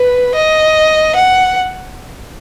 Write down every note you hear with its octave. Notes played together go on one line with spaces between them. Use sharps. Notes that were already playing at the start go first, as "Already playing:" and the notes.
Already playing: B4
D#5
F#5